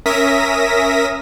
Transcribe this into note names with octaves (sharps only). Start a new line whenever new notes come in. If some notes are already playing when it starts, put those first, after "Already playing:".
C#4 A#4 E5 D#6 A#6 B6